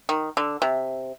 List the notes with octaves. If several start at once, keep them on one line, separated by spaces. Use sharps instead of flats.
D#3
D3
C3